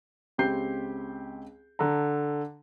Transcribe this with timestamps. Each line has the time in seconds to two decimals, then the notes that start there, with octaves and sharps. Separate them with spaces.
0.38 C#2 C4 G4 G6 C7
1.79 D3 A4 A#5